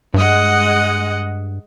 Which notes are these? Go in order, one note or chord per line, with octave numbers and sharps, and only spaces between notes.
G2 G#3 D#5 F#5